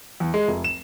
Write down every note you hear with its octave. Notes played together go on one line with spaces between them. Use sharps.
E2
G#3
F1
E7